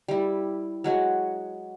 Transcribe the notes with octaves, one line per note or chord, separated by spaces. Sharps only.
G3 E4
F#3 G#3 F#4